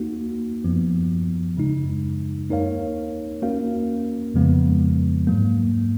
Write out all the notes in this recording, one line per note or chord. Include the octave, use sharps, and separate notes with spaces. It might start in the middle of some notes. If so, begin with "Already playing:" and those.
Already playing: A#3 D#4 F#4
F#2 F3 B3
F#2 C#3 G#3 D#4
A#3 D#4 A#4 C#5 F5
A#3 C#4 F#4 A#4 F5
F2 C#3 F3 G#3 B3
G#2 F#3 A#3